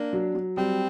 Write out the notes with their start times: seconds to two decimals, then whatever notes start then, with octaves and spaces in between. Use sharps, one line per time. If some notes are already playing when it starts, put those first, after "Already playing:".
Already playing: A#3 D4
0.13 F#3
0.35 F#3
0.57 G3 C4